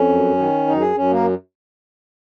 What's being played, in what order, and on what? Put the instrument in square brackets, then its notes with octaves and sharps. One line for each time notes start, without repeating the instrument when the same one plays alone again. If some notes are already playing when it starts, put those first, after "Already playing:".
Already playing: [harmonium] F2 C#4
F#2
D#3
F#2 D#4
G#4
F#2 C#4
A#3